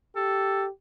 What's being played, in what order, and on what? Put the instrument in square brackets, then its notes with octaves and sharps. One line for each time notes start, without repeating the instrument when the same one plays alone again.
[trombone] G4 [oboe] A4